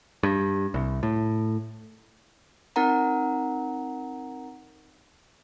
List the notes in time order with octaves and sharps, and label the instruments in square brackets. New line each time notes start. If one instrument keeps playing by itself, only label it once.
[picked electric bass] G2
C2
A2
[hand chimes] C4 D#4 A#4 F#5 A#5